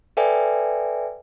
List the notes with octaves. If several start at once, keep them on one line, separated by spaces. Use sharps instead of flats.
A4 B4 D5 E5 G5 G#5